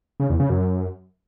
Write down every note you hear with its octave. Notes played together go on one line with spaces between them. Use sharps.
C#3
E2
C#3
F#2